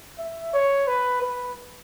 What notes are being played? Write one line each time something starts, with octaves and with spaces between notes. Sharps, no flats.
E5
C#5
B4
B4